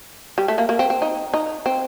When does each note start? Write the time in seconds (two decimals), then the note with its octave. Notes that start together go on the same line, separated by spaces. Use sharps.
0.38 G3
0.48 A3
0.58 A#3
0.69 A#3
0.79 C4
0.90 C4
1.02 D#4
1.33 D#4
1.66 C4